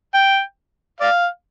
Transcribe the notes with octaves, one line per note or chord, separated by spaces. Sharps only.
G5
D5 F5